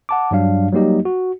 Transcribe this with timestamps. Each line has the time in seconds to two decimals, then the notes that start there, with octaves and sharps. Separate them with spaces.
0.09 F#5 A5 D6
0.31 G2 F#3 G3 D4 F5
0.72 F#3 G3 A#3 D#4 G4 D#5
1.05 F#4